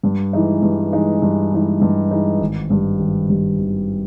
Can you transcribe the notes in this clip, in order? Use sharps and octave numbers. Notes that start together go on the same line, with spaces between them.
G2
E3 G#3 D#4
G2
E3 G#3 D#4
G2
E3 G#3 D#4
G2
E3 G#3 D#4
G#1
G2 G3
G#1
G2 G3
G#1